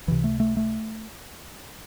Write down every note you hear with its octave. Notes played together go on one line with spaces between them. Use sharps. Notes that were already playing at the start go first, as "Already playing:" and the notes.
C#2 C3 E3
A3
A3
A3